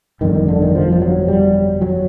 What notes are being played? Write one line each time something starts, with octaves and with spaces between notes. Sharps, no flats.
G1 F2 D3 D#3
D#3
D3
D#3
F3
F3
F#3
G3
F#3